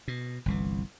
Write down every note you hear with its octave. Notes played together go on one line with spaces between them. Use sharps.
B2
G1 C2 E3